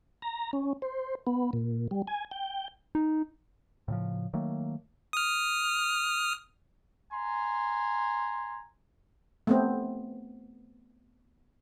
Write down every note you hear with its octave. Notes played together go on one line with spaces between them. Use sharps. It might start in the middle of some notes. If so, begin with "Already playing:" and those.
A#5
C#4
C5
B3
A#2
G3
G#5
G5
D#4
A2 C#3 E3 F3
D#3 F#3 A3 A#3
D#6 F6
G#5 A#5 C6
A3 B3 C4